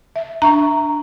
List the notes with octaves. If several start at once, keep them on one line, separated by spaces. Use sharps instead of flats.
E5
D4 E5 A#5 C#6